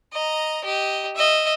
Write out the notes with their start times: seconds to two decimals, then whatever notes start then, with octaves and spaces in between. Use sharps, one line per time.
0.12 D#5 A#5
0.64 G4 D#5
1.16 D#5 E5